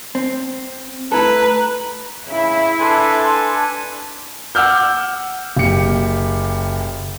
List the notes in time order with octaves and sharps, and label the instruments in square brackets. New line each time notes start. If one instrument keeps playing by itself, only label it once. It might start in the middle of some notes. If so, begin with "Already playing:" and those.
[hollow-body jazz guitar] C4
[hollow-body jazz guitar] A3 E4 A4 [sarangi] B4 [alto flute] A#5
[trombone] C#3 [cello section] E4
[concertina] D4 B4 G#5 [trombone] A4 [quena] C6
[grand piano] F#5 D6 E6 F6 G6
F#1 G4 C#7